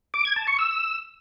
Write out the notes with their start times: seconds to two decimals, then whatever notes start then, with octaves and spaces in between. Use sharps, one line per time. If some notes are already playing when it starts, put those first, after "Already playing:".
0.14 D6
0.25 G#6
0.36 A5
0.47 C#6
0.59 E6